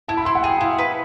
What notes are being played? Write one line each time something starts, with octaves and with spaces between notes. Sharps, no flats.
E4 A5
B5
E4 C6
F#5
G#4 G5
E4 F5
B4